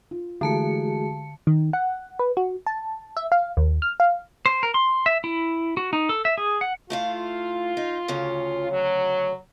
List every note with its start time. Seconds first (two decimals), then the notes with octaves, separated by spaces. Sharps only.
0.11 F4
0.41 D3 E3 G#3 A3 F#4 G#4 A5 C#7
1.47 D#3
1.73 F#5
2.19 B4
2.37 F#4
2.67 A5
3.17 E5
3.32 F5
3.57 D#2
3.82 F6
4.00 F5
4.46 C5
4.63 A#4
4.74 C6
5.06 E5
5.24 E4
5.77 F#4
5.93 D#4
6.09 A4
6.25 E5
6.38 G#4
6.61 F#5
6.90 A3 E4 F4 F5
7.77 D#4
8.08 D2 C#3 C#4
8.71 F#3